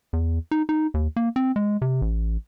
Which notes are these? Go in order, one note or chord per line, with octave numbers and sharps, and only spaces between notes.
E2
D#4
D#4
D#2
A#3
C4
G#3
C3
A1